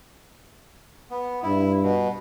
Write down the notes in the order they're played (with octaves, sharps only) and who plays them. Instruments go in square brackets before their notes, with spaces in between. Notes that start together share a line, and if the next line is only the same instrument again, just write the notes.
[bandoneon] B3
[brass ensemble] G2 [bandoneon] E4
[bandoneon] B2